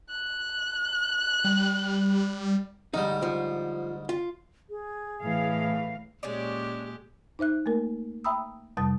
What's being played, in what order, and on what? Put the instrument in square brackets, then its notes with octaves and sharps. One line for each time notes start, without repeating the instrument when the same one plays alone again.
[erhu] F#6
[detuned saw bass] G3
[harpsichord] D2 G#2 G3 [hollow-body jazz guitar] D#4
[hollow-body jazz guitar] F3
F4
[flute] G#4
[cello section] A2 E3 F5
[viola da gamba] A#2 G#3 G4 [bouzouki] C#4 D4 D5
[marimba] D#4 C5 E5 F#6
A3 A#3 A#4
E5 G5 A#5 B5 D#6 E6
F2 C3 G3 A5 D#6 A6